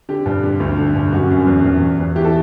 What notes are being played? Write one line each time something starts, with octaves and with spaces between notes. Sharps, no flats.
D3 G4
G2
D3
D2
D3
G2
F#2 F#4
F#2
E2
E2
E2
E2
E3 G4
A4